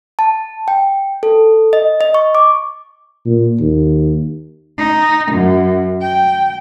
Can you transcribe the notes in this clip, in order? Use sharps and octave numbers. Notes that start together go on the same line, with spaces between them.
A5
G5
A4
D#5
D#5
C#6
D6
A#2
D#2
D#4
F#2
G5